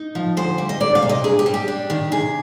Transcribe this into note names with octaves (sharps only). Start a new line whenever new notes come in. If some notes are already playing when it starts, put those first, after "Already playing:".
Already playing: D#4
F3
D2 C5
G3
D#5
D2 D5
F5
C3
D#5
G2 G#4
G4
G3
G4
D4
D#3
C3 G#4